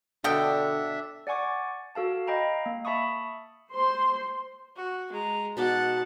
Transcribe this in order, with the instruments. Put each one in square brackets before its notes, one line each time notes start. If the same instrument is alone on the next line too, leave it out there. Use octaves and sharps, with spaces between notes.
[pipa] B2 G5 [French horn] D3 [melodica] D4 E5 [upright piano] A4
[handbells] D5 F#5 G#5 C#6 D6
F#4 A4 F5 A5
D#5 F5 G5 A#5 B5
A#3
E5 A5 B5 C#6 D#6
[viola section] C5 C6
[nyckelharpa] F#4
G#3 A#5
[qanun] B2 D#4 D6 [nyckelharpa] F#5 A5